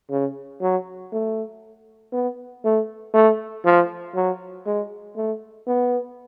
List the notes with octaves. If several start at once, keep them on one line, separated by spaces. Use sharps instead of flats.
C#3
F#3
A3
B3
A3
A3
F3
F#3
G#3
A3
B3